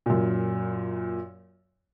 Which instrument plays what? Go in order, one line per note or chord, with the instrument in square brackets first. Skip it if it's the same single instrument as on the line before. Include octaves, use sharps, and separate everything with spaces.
[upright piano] F#2 A#2